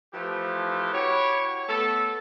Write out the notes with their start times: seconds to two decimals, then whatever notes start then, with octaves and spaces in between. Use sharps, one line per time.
0.14 E3 F3 A3 G4
0.94 E4 F#4 G4 C#5
1.69 A3 B3 A4